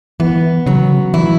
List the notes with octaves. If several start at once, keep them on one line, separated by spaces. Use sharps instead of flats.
E3 B3
C#3 F#3
E3 E4